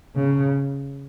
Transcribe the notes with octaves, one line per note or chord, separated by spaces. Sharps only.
C#3